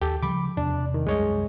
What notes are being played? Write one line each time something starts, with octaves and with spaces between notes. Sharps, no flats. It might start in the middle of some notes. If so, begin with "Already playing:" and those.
D#2 G4 A4
C#3 F3 G3 B5 D6
E2 C3 D4
D#3
C2 F#2 G3 G#3 C#5 D#5